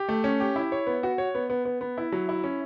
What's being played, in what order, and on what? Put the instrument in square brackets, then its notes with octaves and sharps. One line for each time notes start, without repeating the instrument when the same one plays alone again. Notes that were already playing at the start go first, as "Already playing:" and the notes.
Already playing: [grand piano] G4
A3
C#4
G4
E4
C#5
B3
F#4
C#5
B3
B3
B3
B3
E4
F#3
E4
C#4